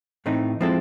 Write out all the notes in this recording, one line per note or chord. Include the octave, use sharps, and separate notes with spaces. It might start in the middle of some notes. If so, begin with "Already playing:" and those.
A2 E3 A3 C4 D#4
F3 G#3 C4 E4 A4